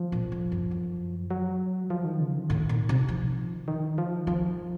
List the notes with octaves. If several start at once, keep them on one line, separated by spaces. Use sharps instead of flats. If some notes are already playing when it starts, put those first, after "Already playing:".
Already playing: F3
A#2
A2
F#2
F#2
F#3
F3
D#3
C#3
D#3
A2
A#2
C3
F3
D#3
F3
D#3 F3